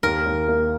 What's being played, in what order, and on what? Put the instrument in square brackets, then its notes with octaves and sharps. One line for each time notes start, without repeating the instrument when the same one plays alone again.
[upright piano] D#2 [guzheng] A#4
[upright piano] D#2
A#3